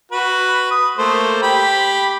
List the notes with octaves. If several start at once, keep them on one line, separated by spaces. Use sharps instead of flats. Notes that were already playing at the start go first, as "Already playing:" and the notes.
F#4 B4
D#6
A3 A#3 C5
G4 B5